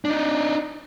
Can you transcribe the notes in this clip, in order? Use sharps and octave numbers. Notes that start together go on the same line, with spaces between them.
D4 D#4